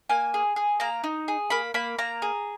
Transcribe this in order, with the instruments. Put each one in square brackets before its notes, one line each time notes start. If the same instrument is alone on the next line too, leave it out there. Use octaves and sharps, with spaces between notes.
[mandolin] A#3 G#5
G#4
G#4
A#3 A#5
D#4
G#4
A#3 B5
A#3 B5
A#3 A#5
G#4